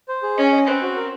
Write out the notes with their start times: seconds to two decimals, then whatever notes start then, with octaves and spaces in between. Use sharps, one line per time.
0.09 C5
0.23 G#4
0.38 C#4 D#5
0.52 D#5
0.66 C4 B4
0.82 F#4
0.96 A#4